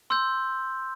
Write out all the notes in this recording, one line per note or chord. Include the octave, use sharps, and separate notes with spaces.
C6 E6 G6